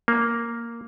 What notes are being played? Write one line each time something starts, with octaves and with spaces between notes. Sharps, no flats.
A#3